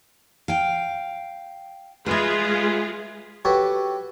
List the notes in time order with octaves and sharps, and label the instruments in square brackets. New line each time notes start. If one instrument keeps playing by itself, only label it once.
[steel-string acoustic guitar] F5 G5
[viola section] G#3 F4 G#4 [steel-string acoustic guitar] B4 E5
[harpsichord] F#4 G4 A4 B4 C#5